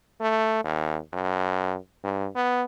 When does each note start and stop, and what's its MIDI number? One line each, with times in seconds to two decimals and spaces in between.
0.21 0.60 57
0.64 0.98 39
1.13 1.76 42
2.04 2.28 43
2.35 2.63 59